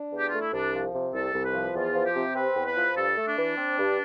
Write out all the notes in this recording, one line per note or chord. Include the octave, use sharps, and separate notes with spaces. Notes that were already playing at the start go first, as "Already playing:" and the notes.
Already playing: D4
E2
G4
A3 F4
E4
C2 D4
F3
C3
C2 A4
C2
B4
F3
E2 F4
F3
G4
C3
C4 B4
E2
B4
F3
G2 A4
A3
D4
E3
C4
G2